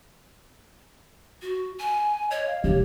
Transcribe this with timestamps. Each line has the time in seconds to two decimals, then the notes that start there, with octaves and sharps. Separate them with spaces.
1.42 F#4
1.79 G#5
2.31 C#5 D#5
2.47 F5
2.64 C2 G4 C#5